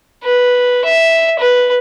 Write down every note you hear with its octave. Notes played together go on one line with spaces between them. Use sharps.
B4
E5
B4